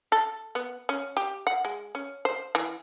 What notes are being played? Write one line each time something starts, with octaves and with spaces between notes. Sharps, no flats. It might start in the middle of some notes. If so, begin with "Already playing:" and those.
A4
B3
C#4
G4
F#5
G#3
C#4
C5
E3